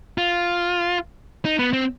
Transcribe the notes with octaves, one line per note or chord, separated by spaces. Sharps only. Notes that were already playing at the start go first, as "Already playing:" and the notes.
F4
D#4
B3
C4